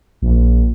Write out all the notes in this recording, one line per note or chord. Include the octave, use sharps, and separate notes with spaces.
A#1